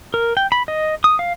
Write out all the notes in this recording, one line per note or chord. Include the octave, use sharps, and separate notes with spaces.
A#4
G5
B5
D#5
D#6
F5